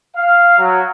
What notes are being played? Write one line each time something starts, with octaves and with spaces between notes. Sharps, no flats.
F5
F#3